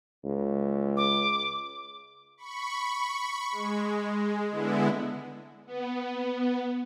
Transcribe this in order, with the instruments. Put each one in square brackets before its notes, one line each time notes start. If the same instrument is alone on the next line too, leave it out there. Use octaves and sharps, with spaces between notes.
[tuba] C#2
[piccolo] D6
[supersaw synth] B5 C#6
G#3
D3 G#3 B3 E4
[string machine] B3